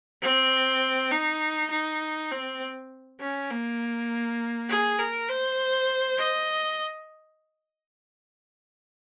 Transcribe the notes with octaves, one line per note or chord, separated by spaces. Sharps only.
C4
D#4
D#4
C4
C#4
A#3
G#4
A#4
C5
D#5